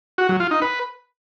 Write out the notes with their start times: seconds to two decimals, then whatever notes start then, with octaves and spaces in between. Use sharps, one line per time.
0.18 F#4
0.29 F#3
0.40 F4
0.51 D#4
0.62 B4